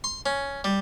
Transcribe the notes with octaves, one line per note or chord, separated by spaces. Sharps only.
C6
C#4
G3